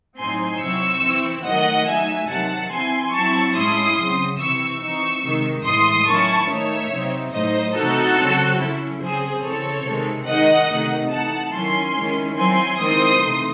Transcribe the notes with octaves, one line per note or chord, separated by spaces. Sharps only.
A2 F#3 C4 D#4 G#5 C6
C3 F#3 C4 E4 C#6 E6
E3 C4 E4
D#3 F#3 A3 D#5 F#5
F#3 A3 D#4 E5 G#5
C3 D#3 F#3 F#5 A5
E3 C4 E4 G#5 C6
F#3 C4 E4 A5 C#6
A2 G#3 C#4 E4 C6 D#6
C#3 F#3 C4
C3 E3 C4 E4 C#6 E6
E3 C4 D#4 C#6 E6
C3 D#3 G#3 D#4
A2 E3 G#3 C6 D#6
D#3 F#3 C#4 E4 A5 C#6
D#3 A3 D#4 C#5 E5
C3 F#3 C4 D#4
A2 F#3 A3 D#4 C5 D#5
C3 E3 A3 D#4 F#4 A4
C#3 F#3 C4
F#3 C#4 E4
C#3 F#3 C4 G#4 C5
C#3 E3 C4 A4 C#5
C3 D#3 G#3 C4
D#3 G#3 D#4 D#5 F#5
C3 D#3 A3 D#4
E3 A3 D#4 F#5 A5
D#3 F#3 C#4 E4 G#5 C6
D#3 G#3 C#4 E4
F#3 C4 E4 G#5 C6
D#3 G#3 C4 E4 C6 D#6
C3 E3 A3 D#4